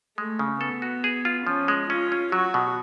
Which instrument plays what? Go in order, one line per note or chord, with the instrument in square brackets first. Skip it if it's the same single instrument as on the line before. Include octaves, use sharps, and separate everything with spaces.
[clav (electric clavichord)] G#3 [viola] A3
[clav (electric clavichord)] C#3
[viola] B3 [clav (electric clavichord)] A4
[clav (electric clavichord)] F#4
G#4
F4
[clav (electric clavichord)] F3 [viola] C#4
[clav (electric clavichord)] G#3
[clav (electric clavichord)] C#4 [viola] F4
[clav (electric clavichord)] C#4
[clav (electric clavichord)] F#3 [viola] F#4
[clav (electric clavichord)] B2